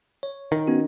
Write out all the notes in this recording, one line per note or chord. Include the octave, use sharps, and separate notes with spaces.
C#5
D#3
B3 C#4 F#4